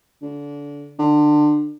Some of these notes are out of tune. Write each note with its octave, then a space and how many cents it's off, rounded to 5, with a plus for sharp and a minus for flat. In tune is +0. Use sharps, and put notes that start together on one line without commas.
D3 -25
D3 +25